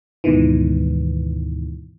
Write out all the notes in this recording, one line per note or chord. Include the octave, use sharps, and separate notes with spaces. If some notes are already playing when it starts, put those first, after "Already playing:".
D2 G#2 B2 D#3 E3